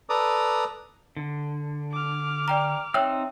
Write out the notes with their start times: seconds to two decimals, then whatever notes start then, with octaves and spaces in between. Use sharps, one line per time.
0.09 A4 B4 D5 A#5 D6 D#6
1.17 D3
1.92 D6 F6
2.48 D5 G5 A#5
2.94 C4 D#4 C#5 E5 G5 E6